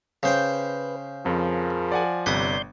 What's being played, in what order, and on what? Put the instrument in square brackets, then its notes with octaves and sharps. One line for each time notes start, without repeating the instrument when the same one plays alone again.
[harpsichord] C#3 C5 G5 [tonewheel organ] B4
[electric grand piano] F2 [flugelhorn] F3 [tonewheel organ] G#4 A#4
[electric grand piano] D5 F#5 G#5
[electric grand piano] G1 C3 [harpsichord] B4 D#6 [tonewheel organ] D5 C6 G6